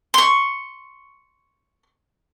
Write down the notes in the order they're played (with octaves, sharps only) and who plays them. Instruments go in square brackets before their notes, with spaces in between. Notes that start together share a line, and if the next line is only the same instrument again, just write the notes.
[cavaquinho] C6 C#6